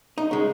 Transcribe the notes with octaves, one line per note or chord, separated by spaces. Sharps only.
D#4
C#3 G#3